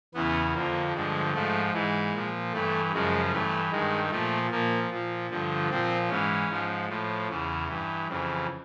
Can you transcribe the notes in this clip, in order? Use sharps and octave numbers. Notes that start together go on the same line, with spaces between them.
E2 C#3 E3 B3
F2 D3 F3 A#3
G2 D3 F3 G#3
G#2 F3 A3
G#2 E3 G#3
A#2 F3
G2 E3 A3
F#2 C#3 F3 G#3
G2 E3 A3
G2 D#3 G#3
A#2 F3 A3
A#2 F3 A#3
A#2 F3
G2 D3 F3
A#2 F3 C4
G#2 E3 C#4
G#2 F3
A2 F3
E2 C#3 E3
G2 E3
F2 C#3 E3